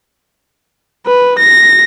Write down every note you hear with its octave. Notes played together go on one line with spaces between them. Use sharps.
B4
A#6